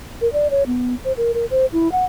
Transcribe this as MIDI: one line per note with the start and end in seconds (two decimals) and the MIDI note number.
0.21 0.31 70
0.33 0.50 74
0.50 0.63 73
0.67 0.95 59
1.05 1.13 72
1.17 1.32 70
1.34 1.46 70
1.51 1.66 72
1.73 1.91 64
1.92 2.05 78